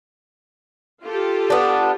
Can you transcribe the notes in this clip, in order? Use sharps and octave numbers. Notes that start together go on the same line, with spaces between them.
F4 G4 A4
B3 D4